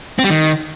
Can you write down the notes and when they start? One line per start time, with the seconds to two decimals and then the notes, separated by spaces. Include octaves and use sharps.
0.19 C4
0.24 G3
0.30 D#3